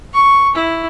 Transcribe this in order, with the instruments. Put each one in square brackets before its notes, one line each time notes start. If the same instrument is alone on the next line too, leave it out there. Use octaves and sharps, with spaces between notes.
[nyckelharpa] C#6
E4